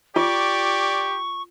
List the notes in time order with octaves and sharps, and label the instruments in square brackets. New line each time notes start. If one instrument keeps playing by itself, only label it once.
[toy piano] F4 [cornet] G4 [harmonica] D5 [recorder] C#6